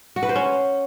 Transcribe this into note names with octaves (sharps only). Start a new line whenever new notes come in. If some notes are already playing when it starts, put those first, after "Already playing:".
F#4
B4
C5
C#4